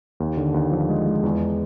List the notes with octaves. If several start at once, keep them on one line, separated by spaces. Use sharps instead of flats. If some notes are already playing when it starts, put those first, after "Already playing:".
D#2
D3
D#2
F3
G#3
G#3
E2